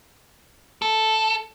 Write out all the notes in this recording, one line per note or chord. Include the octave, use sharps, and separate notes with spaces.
A4